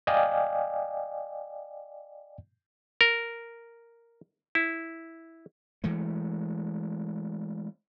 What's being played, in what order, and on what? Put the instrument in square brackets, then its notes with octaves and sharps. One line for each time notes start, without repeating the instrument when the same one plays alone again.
[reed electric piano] D5 D#5 F5 G5 G#5
[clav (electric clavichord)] A#4
E4
[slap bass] E3 G#3 A3